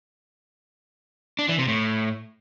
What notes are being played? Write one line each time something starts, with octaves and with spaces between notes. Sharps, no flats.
D4
E3
C3
A2